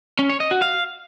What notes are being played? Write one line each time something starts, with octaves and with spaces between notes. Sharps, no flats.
C#4
C#5
D#5
F#4
F5